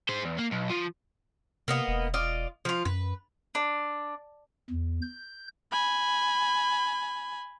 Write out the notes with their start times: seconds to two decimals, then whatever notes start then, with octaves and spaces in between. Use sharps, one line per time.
0.09 G#4 C5
0.25 E2
0.39 A#3
0.52 B1
0.70 F3
1.68 C3 A#3 B3 D#5
1.88 E1
2.14 F4 D5 D#5
2.65 F3 F4
2.85 F#2 B4
3.55 D4
4.70 E2
5.02 G6
5.72 G#5 B5